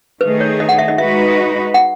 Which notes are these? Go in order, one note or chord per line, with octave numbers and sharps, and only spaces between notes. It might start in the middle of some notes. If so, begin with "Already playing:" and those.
D#3 A3 D#4 G#4 B4
C#5
D#5
F#5
E5
D#5
G#3 D#4 F#4 B4 E5
F#5